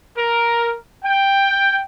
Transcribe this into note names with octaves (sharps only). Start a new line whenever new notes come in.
A#4
G5